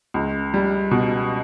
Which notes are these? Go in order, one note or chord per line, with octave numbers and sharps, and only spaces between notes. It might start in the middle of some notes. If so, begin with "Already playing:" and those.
C#2
G3
B2